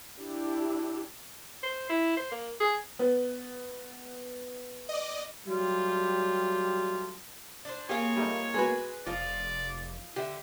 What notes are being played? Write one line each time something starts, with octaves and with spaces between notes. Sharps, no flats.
D4 E4 G4
C5
E4
C5
A#3
G#4
B3
D5 D#5
F#3 G3 A3 F4 G4
D4 C5
A#3 C4 F4 G4 G#4 C#5
G3 A3 A#3 D#4
G#3 B3 F#4 G#4 B4
F1 F3 D#4 F4 D5
D3 G4 E5